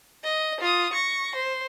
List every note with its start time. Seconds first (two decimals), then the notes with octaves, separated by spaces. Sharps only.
0.24 D#5
0.60 F4 D#6
0.93 C#6 A#6
1.36 C5